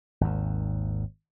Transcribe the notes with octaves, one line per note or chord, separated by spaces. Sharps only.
G#1 D#2